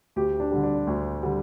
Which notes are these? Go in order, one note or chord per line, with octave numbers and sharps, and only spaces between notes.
D2 G4
D4
D3 G3
D4
D2
D3 G3